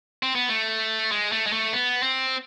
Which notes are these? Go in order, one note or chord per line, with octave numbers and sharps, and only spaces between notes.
C4
B3
A3
G#3
A3
G#3
A3
B3
C4